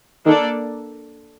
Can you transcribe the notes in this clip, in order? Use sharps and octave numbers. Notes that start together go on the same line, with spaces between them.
D#3 A#3 D4 A4 D5